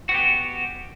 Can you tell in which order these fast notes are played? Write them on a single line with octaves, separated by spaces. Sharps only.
F#4 B3 G4